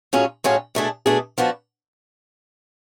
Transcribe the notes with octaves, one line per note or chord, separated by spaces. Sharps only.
A2 F#3 C#4 F4 G#4
A2 F#3 C#4 F4 G#4
B2 A3 D4 G#4
B2 A3 D4 G#4
F3 B3 D4 F#4